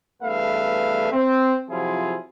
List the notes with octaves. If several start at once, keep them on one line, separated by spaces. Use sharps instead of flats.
E2 G2 A3 B4 E5 F5
C4
C3 F3 F#3 E4 F4 G#4